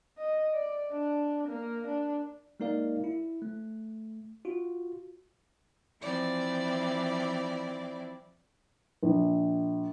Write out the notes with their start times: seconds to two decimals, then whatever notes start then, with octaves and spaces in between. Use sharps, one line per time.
0.17 D#5
0.53 D5
0.92 D4
1.48 A#3
1.87 D4
2.60 G#3 A#3 D#4 A#4 D5 F5
3.04 E4
3.42 A3
4.45 F4 F#4
6.02 E3 F3 C4 E4 D5
9.03 A#1